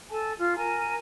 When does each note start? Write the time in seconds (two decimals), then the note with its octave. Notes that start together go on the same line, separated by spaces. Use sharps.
0.10 A4 G#5 A5
0.38 F4 F6
0.57 A#4 G#5 A#5